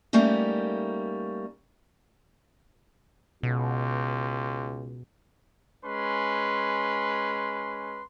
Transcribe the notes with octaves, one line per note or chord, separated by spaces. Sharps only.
G3 A3 A#3 C#4 D#4
C#2 B2
G#3 C#4 B4 C6